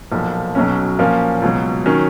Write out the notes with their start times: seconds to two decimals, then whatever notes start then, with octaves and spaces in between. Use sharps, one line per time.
0.12 B1 A#2 F3 A#3
0.55 B1 B2 F#3 C#4
0.99 A#2 F3 A#3 C#4
1.42 C#2 B2 F#3
1.86 D#3 F#3 C#4